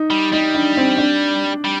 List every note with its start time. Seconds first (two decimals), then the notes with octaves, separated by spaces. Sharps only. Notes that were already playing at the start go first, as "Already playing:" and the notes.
Already playing: D#4
0.11 G3
0.32 G3 D#4
0.55 D4
0.77 C4
0.98 D4
1.65 G3